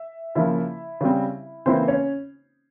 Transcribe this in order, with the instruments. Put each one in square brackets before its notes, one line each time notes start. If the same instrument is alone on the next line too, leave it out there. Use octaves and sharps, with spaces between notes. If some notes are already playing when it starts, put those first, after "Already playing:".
Already playing: [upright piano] E5
C#3 F3 A#3 E4 E5
C#3 G3 C4
C#3 E3 A#3 C4 E4 C5
C#4 C#5